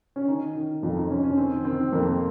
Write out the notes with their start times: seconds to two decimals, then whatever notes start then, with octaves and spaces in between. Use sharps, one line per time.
0.16 C#4
0.27 D#3 D#4
0.55 D#3
0.83 F2 F4
0.97 D#4
1.10 F2 C#4
1.24 C#4
1.37 D#3 C4
1.65 D#3 C4
1.92 F2 A#3